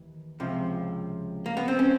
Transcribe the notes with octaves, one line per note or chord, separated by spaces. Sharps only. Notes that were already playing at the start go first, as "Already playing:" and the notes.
Already playing: D#2 E3
C#2 C3 F3
A#3
B3
C4
C#4